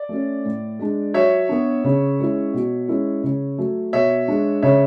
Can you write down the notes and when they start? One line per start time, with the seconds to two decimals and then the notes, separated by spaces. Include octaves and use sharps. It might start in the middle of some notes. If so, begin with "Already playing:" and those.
Already playing: D5
0.09 A3 C#4
0.45 A2
0.79 G#3 D4
1.14 F#3 C#5 E5
1.49 B3 D4
1.84 C#3
2.19 G#3 C#4 E4
2.53 B2
2.88 G#3 C#4 E4
3.23 C#3
3.58 F#3 A3
3.93 B2 C#5 E5
4.28 G#3 D4
4.63 C#3 C#5 E5